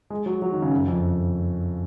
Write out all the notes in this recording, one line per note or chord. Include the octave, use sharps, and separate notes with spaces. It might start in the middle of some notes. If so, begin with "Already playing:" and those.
G#3
F#3
F#3
D#3
C#3
F#2
F2